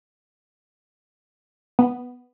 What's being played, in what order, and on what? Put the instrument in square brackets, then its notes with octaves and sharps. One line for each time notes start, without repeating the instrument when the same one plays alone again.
[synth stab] B3